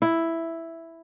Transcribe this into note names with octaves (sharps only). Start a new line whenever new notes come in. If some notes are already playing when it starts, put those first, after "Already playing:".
E4